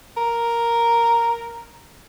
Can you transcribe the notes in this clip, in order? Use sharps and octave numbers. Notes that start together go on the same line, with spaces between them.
A#4